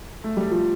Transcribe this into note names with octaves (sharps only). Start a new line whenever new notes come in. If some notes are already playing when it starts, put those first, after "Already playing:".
A3
G3
F3